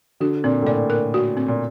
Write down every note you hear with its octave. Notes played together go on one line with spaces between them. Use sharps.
D3 F#4
A#2 C4
A2
A#2 D5
A#4
F#4
C4
A#2